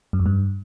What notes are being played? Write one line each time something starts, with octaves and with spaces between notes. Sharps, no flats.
F#2
F2
G2